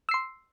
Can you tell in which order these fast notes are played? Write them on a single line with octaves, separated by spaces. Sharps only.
E6 C7 C6